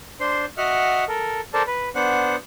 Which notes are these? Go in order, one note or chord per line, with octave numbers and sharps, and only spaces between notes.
D4 C5 C6
F#4 D#5 E5 F#5 F6
A4 A#4
A4 A#4 C5 D5 A5
B4
B3 D4 C5 F#5